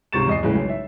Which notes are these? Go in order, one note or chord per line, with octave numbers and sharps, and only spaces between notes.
C#2 G#2 C3 C#6 A6 E7
E2 D#5 C7
A2 C#3 E3 G#3
B1
E5